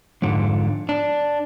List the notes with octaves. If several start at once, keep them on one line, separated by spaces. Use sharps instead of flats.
F2 G#2 D3
D4